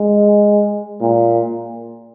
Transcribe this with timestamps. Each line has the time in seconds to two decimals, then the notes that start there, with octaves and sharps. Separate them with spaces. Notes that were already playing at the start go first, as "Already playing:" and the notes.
Already playing: G#3
1.00 A#2